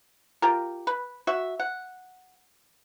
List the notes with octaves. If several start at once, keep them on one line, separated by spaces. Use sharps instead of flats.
F4 G4 A#4
B4
F#4 E5
F#5